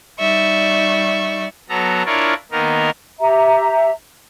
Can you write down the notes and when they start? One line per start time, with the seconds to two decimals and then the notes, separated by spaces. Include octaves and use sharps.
0.19 G3 D#4 D5 E5 C#6
1.69 F#3 B3 A4 A#5
2.06 D4 E4 F4 A#4 C#5 D5
2.52 D#3 A#3 B3 D#4 A#4
3.20 G4 E5 A#5